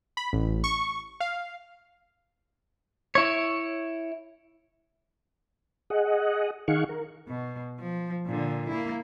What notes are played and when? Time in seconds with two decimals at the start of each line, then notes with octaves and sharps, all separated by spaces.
0.17 B5
0.33 A1
0.64 C#6
1.20 F5
3.15 E4 C#5
5.90 G#4 D#5 F#5
6.68 D#3 D#4 G#4 F5 F#5 C#6
6.89 A#4
7.28 B2
7.79 F3
8.26 A#2 D3
8.69 A#3 E4